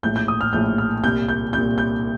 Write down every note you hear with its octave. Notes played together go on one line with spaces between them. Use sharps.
A#1 A2 G6
G6
D#6
F6
A#1 A2 G6
F6
C2 A#2 G6
G6
C2 A#2 G6
G6